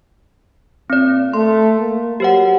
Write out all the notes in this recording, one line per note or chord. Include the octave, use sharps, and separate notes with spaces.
A#2 C4 D5
A3 C6
A#3
F#3 G4 C5 F#5